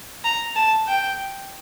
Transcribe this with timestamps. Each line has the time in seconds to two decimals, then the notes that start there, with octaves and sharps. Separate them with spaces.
0.24 A#5
0.56 A5
0.87 G5